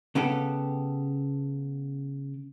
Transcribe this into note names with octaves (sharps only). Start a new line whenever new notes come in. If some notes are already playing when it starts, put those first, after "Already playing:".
C#3 B3 G4 A4